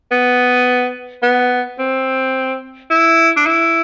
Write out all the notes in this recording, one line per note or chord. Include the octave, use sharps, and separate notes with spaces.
B3
B3
C4
E4
D4
E4